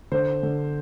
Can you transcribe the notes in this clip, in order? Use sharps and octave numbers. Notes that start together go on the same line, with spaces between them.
D3 C5
D3